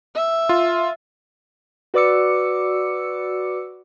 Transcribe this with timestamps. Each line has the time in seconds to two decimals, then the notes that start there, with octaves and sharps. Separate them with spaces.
0.15 E5
0.49 F4
1.94 F#4 B4 D5 D6 E6 C#7